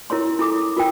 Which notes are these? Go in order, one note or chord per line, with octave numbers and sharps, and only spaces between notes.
E4 A#4 C#5 C6
E4 A4 D6 D#6
F4 A#4 G5